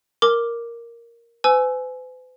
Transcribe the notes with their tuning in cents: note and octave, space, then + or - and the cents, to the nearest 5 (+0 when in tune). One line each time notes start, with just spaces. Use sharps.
A#4 +0 D6 +0
B4 +45 G#5 +20 E6 +0